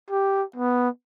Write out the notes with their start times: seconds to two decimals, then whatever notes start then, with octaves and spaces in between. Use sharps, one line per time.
0.10 G4
0.56 B3